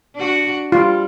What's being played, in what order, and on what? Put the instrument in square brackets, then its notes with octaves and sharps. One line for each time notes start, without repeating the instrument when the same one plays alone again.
[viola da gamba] D4 F#4
[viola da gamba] G3 [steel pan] F4